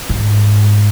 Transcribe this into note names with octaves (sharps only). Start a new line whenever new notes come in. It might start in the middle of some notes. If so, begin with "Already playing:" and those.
G#2